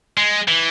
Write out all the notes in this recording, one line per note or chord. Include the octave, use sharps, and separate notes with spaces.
G#3
E3